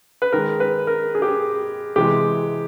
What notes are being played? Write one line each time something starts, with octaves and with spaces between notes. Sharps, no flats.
B4
D#3 G#3 A#4
B4
A#4
G#4
G4
G#4
C3 E3 G#3 G4